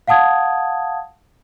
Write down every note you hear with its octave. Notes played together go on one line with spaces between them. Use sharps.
F5 F#5 A5 D#6 G#6